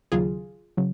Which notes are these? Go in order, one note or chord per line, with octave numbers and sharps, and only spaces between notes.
D#2 C#3 F#3 F4 G#4
C#3 F#3